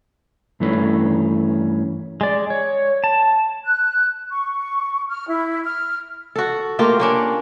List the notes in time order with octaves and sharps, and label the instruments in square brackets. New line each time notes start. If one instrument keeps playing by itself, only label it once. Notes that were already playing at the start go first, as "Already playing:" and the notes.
[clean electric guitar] G2 E3 A3 C#4
[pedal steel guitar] G#3 D5
C#5
A5
[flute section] F#6
C#6
F6
E4
F6
[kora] F#4 A4
A3 A#3 F4 G4
A#3 C#4 D4